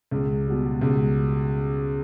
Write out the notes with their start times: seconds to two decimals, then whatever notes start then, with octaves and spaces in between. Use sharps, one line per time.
0.11 C#2
0.47 B2 G3
0.81 C#2